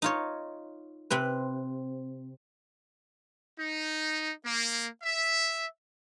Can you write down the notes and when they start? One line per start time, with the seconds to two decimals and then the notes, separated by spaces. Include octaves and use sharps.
0.02 D#4 F4 C#5
1.10 C3 C4 B4
3.58 D#4
4.45 A#3
5.03 E5